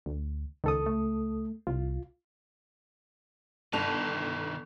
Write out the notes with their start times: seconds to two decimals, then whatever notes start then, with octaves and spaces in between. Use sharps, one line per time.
0.06 D2
0.64 C#2 D#3 A4 D#6
0.86 A3
1.67 C2 F4
3.73 G1 D#3 B4 A5 F7